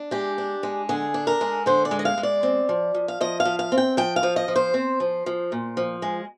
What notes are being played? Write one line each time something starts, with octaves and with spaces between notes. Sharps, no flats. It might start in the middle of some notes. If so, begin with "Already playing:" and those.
Already playing: D4
G#3 G4
D4
G#3
D3 G#4
D4
A#4
G#3
D3 C5
D5
G#3
D#5
F5
G#3
D5
C4
F3
F3
F5
F3 D#5
F5
F3
F5
C4
G5
F3 G5
F5
F3
D#5
F3
C5
C4
F3
F3
A#2
F3
G#3